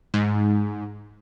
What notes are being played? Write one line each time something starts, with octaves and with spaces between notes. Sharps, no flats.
G#2